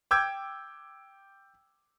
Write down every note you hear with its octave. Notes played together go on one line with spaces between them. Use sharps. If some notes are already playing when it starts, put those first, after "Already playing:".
G5 D6 E6 G6 G#6